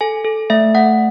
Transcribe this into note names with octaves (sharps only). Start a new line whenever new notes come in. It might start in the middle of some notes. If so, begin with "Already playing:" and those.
A4 G#5
A4
A3 E5
A3 F#5